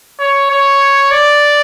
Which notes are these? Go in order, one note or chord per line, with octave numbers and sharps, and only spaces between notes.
C#5
C#5
D5